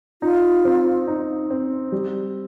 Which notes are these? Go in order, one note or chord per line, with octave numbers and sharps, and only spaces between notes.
D#4 F4
C4
D#4
C4
G3